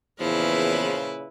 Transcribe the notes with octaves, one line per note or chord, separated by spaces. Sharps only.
E2 A#2 C#3 F3 E4 B4